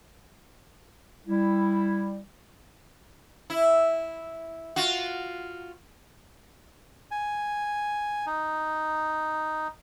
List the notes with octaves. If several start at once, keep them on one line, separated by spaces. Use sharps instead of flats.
G3 E4
E4
F4 F#4
G#5
D#4